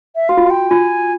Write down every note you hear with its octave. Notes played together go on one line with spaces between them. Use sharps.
E5
F#4 F5
F4
F#4
G5
F4 G#5